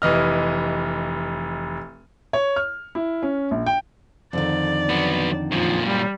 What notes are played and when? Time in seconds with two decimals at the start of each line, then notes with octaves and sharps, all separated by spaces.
0.02 F1 E3 D#5 F6
2.33 C#5
2.56 F6
2.95 E4
3.23 C#4
3.51 A#1
3.66 G5
4.33 F2 D3 D#3 D5
4.89 F#3 B3
5.51 F#2 A#2 F3
5.87 G3